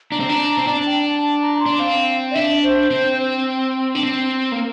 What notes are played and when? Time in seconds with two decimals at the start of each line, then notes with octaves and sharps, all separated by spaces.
0.11 D4 A#5
0.20 C4
0.29 D4
0.40 A#5
0.58 C4
0.67 D4 A5
0.86 G5
1.05 A5
1.23 A5
1.42 A#5
1.60 C6
1.66 D4
1.79 C4 F5
2.31 D5
2.35 D4 E5
2.63 C5
2.91 C4
3.95 D4
4.03 C4
4.52 A#3